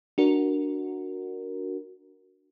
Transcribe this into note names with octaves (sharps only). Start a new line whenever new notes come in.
D4 F#4 A#4